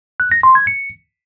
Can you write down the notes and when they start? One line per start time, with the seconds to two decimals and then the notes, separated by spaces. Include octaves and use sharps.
0.20 F#6
0.32 A#6
0.43 C6
0.55 G#6
0.67 C#7